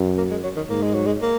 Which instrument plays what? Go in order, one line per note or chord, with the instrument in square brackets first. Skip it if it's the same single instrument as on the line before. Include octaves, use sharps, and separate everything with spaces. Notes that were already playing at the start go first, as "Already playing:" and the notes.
Already playing: [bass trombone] F#2
[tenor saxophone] A#3
G#3
F#3
D#3
[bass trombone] G#2 [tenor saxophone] A#3
[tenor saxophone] G#3
F#3
G#3
A#3